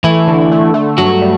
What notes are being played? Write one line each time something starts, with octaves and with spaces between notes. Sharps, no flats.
E3 A3 E4
D3
A3
A3
G2 F#3 F#4
G3